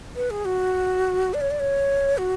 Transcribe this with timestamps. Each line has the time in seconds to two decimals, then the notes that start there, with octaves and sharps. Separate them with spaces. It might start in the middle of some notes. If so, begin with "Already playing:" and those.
0.16 B4
0.30 G#4
0.45 F#4
1.34 D5
1.41 C#5
1.51 D5
1.60 C#5
2.18 F#4